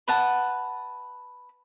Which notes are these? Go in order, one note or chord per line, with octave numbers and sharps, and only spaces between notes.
B4 F#5 A5